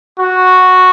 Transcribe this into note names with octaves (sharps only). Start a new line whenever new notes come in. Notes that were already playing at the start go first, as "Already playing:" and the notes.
F#4